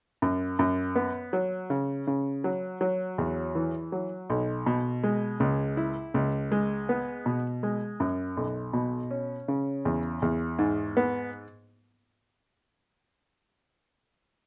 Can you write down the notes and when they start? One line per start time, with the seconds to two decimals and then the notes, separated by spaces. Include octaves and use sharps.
0.22 F#2
0.59 F#2
0.96 B3
1.33 F#3
1.70 C#3
2.07 C#3
2.44 F#3
2.81 F#3
3.18 E2
3.55 E3
3.92 F#3
4.30 B1
4.66 B2
5.03 G#3
5.40 C#2
5.77 E4
6.14 C#2
6.52 G#3
6.89 B3
7.26 B2
7.63 G#3
8.00 F#2
8.37 B1
8.73 B2
9.11 C#4
9.48 C#3
9.85 E2
10.22 E2
10.59 G#2
10.97 B3